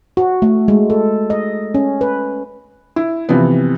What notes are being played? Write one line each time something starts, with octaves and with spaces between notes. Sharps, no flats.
F#4
A3
G#3
A4
D#5
C#4
B4
E4
C3 E3 F3 B3